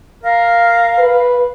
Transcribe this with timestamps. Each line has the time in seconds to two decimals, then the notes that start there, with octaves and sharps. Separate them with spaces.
0.24 A#4 F5
0.98 B4